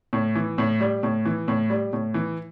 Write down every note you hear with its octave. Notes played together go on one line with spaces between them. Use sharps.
A2
E3
A2
G3
A2
E3
A2
G3
A2
E3